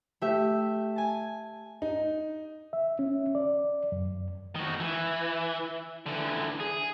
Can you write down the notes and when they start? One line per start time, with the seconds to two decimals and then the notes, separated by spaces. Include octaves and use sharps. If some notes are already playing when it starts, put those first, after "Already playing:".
0.21 A3 G4 E5
0.96 G#5 A5
1.82 D#4
2.73 E5
2.99 C#4
3.35 D5
3.92 F#2
4.55 D#3 F#4
4.80 E3
6.06 D3 E3
6.60 G#4